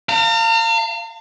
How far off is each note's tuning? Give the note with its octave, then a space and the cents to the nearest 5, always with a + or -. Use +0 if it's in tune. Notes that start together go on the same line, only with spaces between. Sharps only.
F5 -10 A#5 -45